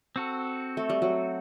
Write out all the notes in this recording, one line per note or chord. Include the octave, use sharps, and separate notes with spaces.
C4 F#4 A4
A3
G3
F#3